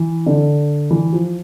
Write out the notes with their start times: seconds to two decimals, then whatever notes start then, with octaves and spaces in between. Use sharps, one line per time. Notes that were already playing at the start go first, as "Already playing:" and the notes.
Already playing: E3
0.26 D3
0.91 E3
1.13 F3